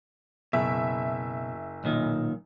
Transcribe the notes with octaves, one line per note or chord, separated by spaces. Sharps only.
F#1 B2 E5
B1 A#2 D#3